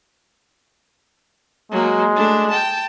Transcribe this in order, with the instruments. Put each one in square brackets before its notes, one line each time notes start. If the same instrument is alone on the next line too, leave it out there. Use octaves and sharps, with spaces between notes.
[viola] F#3 A#3 [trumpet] G#3
[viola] A3 D4
G5 A5